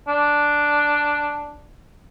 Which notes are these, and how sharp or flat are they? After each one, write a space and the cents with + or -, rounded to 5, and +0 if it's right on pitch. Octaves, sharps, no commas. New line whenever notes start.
D4 +0